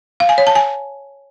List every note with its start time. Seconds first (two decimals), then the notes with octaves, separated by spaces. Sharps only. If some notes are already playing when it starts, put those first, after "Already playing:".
0.20 F5
0.29 G#5
0.38 C#5
0.47 A5
0.55 G#5